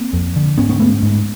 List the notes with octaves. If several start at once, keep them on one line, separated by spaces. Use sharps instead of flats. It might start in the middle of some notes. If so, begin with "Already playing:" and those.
Already playing: A#3 C4
F2
D3
G#2 B3 C#4
B3 C#4
G#2 A3 B3
G#2